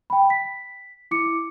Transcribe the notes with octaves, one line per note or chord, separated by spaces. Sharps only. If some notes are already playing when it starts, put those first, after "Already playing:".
G5 B5
B6
E4 D6 C#7